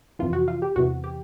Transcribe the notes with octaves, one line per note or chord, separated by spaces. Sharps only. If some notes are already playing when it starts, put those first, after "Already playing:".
F2 C3 E3 F4
F#4
F4
G4
E2 C3 E3 F#4
G4